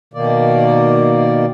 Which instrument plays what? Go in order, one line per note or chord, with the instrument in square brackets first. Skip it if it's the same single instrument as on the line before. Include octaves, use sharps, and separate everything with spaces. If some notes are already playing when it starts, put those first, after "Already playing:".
[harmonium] B2 D#3 A#3 D5